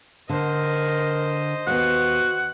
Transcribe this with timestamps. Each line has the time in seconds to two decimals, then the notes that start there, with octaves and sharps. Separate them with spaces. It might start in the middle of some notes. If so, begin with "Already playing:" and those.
0.29 D3 A#4 C5 D#5
1.67 D#2 B3 F#4 F#5